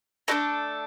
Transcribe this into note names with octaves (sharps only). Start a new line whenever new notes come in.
A3 D4 F#4 A4 D#5